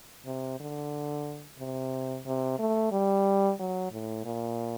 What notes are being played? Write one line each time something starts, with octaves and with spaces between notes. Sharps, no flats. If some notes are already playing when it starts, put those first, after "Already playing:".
C3
D3
C3
C3
A3
G3
F#3
A2
A#2